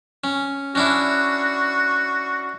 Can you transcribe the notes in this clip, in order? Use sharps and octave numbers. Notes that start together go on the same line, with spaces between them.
C#4
C#4 D4 E4 F#4